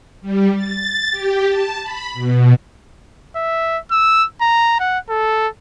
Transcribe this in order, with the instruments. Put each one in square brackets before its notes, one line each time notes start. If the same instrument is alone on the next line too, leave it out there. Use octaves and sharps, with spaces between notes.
[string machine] G3
A6
G4
A5
B5
B2
[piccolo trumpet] E5
E6
A#5
F#5
A4